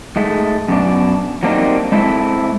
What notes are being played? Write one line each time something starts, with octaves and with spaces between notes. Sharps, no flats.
G#2 G#3 A3
F#2 B2 D4
F#3 G3 A#3 C4 D4 D#4
G#3 C4 E4 A4 E5